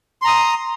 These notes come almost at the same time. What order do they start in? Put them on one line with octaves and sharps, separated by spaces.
C6 A#5 D#6